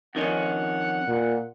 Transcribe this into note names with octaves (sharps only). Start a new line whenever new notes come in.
F2 D#3 C#4 F#5
A#2